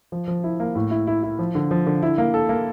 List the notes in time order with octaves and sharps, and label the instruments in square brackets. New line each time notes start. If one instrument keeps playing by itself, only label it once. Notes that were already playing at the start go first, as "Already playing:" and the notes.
[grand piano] F3
F3
E4
A#3
A2
E4
E4
E4
F3
D3
F3
D3
E4
A#3
A4
A#3